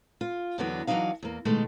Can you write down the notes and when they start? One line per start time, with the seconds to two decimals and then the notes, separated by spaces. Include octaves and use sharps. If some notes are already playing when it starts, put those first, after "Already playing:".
0.21 F4
0.58 E2 D3 E3 F#3 B3 D4
0.87 E3 F#3 G#3 D4 D#4 F5
1.23 E2 A#3
1.45 B2 D#3 G#3 A3